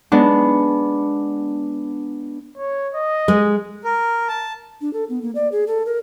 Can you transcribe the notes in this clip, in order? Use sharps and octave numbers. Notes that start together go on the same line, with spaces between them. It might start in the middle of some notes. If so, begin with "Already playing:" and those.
G#3 B3 D4
C#5
D#5
G#3
A#4
A5
D4
A4
B3
A#3
D5
G#4
A4
A#4